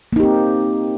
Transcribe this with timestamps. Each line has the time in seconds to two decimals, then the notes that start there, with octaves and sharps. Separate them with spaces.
0.13 A#3
0.16 D#4
0.20 G4
0.23 C4